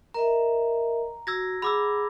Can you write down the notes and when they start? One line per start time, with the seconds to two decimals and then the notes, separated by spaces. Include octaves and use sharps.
0.14 A#4 D#5 E5 A#5
1.27 F#4 E6 G#6 A#6
1.62 G#4 F#5 B5 D6 E6